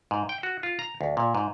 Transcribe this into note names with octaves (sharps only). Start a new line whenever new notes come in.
G#2
G5
F#4
F4
A#5
D2
A#2
G#2